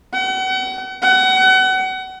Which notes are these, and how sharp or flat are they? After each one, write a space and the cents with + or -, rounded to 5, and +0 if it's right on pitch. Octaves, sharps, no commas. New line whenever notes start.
F#5 +40
F#5 +30